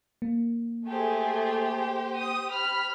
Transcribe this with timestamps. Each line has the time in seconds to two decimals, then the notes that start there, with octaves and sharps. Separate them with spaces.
0.22 A#3
0.86 A3 G4 G#4 C5
2.17 D#6
2.52 B5 F6